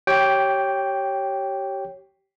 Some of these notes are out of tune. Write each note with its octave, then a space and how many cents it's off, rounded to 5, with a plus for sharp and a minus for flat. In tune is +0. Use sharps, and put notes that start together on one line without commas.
G4 -25 C#5 -10 G5 +0